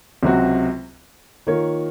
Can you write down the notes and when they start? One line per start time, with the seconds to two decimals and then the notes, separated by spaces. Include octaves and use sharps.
0.23 C#2 C3 F#3 C4 F#4
1.47 D#3 A#3 F4 A#4 C#5